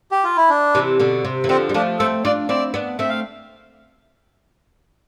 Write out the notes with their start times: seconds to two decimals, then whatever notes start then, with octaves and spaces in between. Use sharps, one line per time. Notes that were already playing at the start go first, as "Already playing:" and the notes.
0.11 G4
0.24 F4
0.37 E4
0.50 D4
0.75 C3 E3
1.00 B2 D3
1.25 C3
1.44 E3
1.49 D3 F3 C4
1.69 G3
1.74 F3 A3 D4
1.99 A3 C4 A4
2.24 D4 F4 D5
2.49 C4 E4 D5
2.74 B3 D4
2.99 A3 C4 E5
3.09 F5